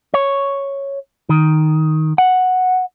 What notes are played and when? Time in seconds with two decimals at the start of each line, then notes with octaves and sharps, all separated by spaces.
0.14 C#5
1.29 D#3
2.18 F#5